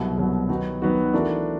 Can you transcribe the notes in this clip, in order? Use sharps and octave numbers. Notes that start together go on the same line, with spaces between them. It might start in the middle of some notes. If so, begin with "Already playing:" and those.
Already playing: C2 B2 F#3
C2 B2 F#3
D#3 F#3 B3 D#4 F#4
D#3 F#3 B3 D#4 F#4
E3 A3 D4 F#4 A#4